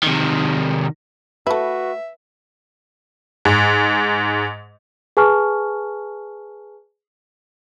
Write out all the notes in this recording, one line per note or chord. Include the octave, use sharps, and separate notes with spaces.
C3 D#3
A3 E4 F#4 B4 E5
G#2
G#4 B4 G#5 A5 C#6 F6